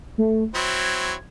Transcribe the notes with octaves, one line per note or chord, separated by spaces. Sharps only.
A3
F#3 C4 E4 G#6